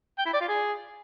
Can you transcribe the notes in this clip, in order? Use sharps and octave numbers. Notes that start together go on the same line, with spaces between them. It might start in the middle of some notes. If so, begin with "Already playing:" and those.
G5
E4
D5
F4
G#4